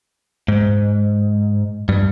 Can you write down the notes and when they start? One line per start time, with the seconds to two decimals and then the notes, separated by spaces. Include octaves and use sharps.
0.48 G#2
1.89 G2